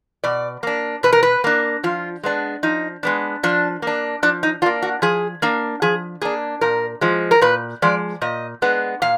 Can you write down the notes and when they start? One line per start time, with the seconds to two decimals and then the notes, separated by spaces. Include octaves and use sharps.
0.24 B2 D5
0.63 A#3 D4
1.03 B2 B4
1.13 A#4
1.23 B4
1.44 A#3 D4
1.83 F3 F4
2.23 G#3 B3 D4
2.63 F3 D#4
3.03 G#3 B3 D4
3.43 F3 D4
3.82 A#3 D4
4.23 F3 D4
4.43 D#4
4.62 A#3 D4 F4
4.82 F#4
5.02 F3 G#4
5.42 A#3 D4
5.82 F3 G#4
6.22 A#3 D4 G#4
6.61 A#2 A#4
7.01 F3 G#3
7.31 A#4
7.41 A#2 B4
7.82 F3 G#3 D5
8.21 A#2 D#5
8.62 G#3 B3 D4
9.02 A#2 F5